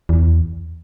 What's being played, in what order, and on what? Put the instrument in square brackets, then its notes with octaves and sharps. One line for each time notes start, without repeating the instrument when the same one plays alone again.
[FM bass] E2